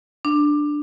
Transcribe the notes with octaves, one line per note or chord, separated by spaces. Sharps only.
D4